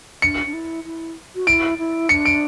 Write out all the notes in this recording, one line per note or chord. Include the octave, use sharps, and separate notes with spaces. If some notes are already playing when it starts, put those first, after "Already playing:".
D4 C#7
D4
E4
E4
F#4
E4 D7
E4
D4 C#7
D7